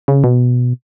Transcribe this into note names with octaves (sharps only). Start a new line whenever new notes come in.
C#3
B2